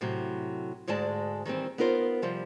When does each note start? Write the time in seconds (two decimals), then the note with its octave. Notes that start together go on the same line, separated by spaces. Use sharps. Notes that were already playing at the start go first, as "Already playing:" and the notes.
0.01 A2 C3 F#3
0.87 D2 G#2 G#3 D5 A5
1.45 D#3 E3 G3 C4
1.78 B3 D#4 F4 A#4 C5
2.22 C3 F3 G3